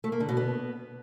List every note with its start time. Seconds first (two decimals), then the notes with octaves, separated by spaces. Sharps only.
0.04 A3
0.12 A#3
0.20 D3
0.29 B2
0.37 B3